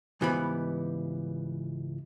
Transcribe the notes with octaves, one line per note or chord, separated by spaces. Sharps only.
C#2 G#2 E3 G3 B3 B5